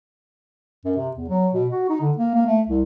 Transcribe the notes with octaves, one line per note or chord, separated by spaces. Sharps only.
F#2
C3
E2
F#3
B2
F#4
D#4
D3
A#3
A#3
A3
C2